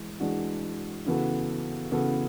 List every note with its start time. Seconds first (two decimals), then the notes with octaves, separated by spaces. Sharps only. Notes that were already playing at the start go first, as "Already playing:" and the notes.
Already playing: E3 G#3
0.20 E3 G#3 D4 F#4
1.06 C#3 E3 B3 F#4 A4
1.92 C#3 E3 B3 F#4 A4